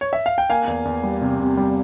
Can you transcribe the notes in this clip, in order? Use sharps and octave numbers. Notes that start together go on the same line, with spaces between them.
C#5
E5
F5
G5
A#3 F5 G#5
E2
E2
G3
C3
C3
G3